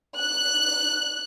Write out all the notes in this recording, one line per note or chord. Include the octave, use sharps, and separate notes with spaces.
F#6